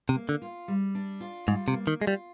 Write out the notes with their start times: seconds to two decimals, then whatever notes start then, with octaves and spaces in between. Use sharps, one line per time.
0.09 C3
0.16 A#3
0.29 D3
0.42 F4
0.68 G3
0.95 D4
1.20 F4
1.47 G#2 G3
1.68 C3
1.74 A#3
1.87 D#3
2.00 G#3 F4
2.07 G3